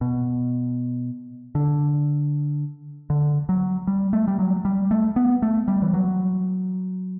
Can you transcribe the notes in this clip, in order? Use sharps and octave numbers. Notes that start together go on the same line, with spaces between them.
B2
D3
D3
F#3
G3
A3
G3
F#3
G3
A3
B3
A3
G3
E3
F#3